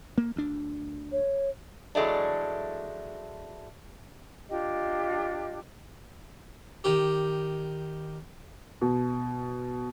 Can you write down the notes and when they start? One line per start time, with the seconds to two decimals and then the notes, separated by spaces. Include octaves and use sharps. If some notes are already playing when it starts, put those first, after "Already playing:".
0.18 A#3
0.36 D2 D4
1.12 C#5
1.95 E3 F#3 G#3 A3 D4
4.50 D4 F4 G4 D#5
6.84 D#3 G4
8.81 B2